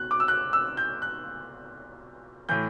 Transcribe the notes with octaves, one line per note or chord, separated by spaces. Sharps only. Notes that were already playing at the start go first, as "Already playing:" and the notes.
Already playing: B2 F#6
D6
E6
F#6
E6
G6
F#6
A2 E3 G6